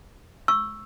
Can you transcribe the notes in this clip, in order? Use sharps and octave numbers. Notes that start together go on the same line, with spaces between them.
C#6 E6